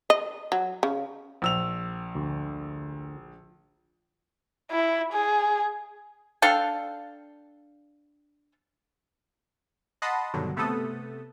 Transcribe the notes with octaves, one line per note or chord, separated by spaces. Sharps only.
D#5
F#3
C#3
A#1 E6 F7
D2
E4
G#4
D4 A4 F5 G5
D#5 F#5 A5 B5 C6 D#6
G2 B2 D3 D#3 F#3
C3 A3 B3 A4 D#6